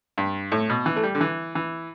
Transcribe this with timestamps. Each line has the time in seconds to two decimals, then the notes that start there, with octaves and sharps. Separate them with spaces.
0.18 G2
0.52 A2
0.70 B2
0.86 E3
0.96 A3
1.03 G3
1.15 D3
1.21 E3
1.55 E3